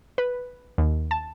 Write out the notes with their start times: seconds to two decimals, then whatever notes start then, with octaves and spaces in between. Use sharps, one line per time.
0.18 B4
0.78 D#2
1.11 A5